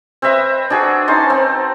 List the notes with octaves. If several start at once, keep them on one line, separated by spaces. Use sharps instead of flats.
C4 B4 D#5 E5
D4 F#4 G#4
C#4 D#4 A5 C6
C4